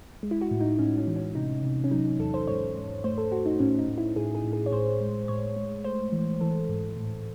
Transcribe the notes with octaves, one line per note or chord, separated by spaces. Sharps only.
G#3
E4
F#4
A2
D#4
A2 C#4
C#4
E3
C#4
C3 D#4
C3
C#4
F#3 D#4
C#4
E2 A4
C5
G#2 C#5
G#2
A3 C5
A4
A3 F#4
D#4
A2 C#4
D#4
A2
E4
A2 G#4
G#4
A2
G#4
C#5
A2 C5
G#3
A2 C#5
G#3
A3 C5
E3
E3 A4
G#2
A2